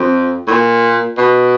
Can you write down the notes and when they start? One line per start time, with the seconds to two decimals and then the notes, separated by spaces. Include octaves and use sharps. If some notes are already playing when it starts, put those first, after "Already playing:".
Already playing: F2
0.47 A2
0.52 A#2
1.18 B2